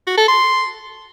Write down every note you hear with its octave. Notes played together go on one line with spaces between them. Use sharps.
F#4
A4
C6